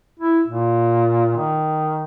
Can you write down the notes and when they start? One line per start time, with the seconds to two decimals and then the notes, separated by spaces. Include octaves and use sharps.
0.19 E4
0.46 A#2
1.37 D#3